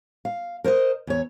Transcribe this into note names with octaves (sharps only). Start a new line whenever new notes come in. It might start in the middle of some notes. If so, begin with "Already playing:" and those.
F5
A#4 C5 D5 D#5
E2 C#5